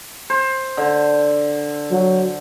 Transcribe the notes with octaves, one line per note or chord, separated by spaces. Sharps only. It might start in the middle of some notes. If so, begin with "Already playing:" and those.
C5
D3
F#3